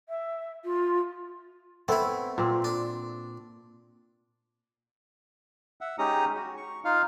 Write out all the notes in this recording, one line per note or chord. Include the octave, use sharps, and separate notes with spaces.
E5
F4
A3 B3 C4 E4
A#2 C4
D4
E5 F#5
G#3 C#4 D#4 G4 A#5 D#6
F#4
C#6
D#4 F4 F5